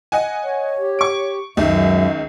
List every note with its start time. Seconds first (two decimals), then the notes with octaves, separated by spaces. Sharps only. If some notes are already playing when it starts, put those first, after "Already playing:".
0.12 D#5 F#5 G#5
0.43 C#5
0.79 G4
0.99 C#6 D7
1.57 C#2 F#2 D#3 E5